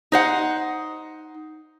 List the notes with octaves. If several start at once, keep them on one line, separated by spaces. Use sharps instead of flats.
D#4 C5 F#5